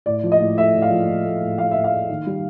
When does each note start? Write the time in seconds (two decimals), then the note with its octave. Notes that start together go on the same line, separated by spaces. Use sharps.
0.06 A2 D5
0.23 F3
0.32 D#5
0.40 A2
0.58 A3 E5
0.74 A2
0.82 F5
0.91 F3
1.08 A2
1.25 A3
1.41 A2
1.58 F3 F5
1.71 A2 E5
1.84 F5
1.92 A3
2.09 D#3
2.27 G3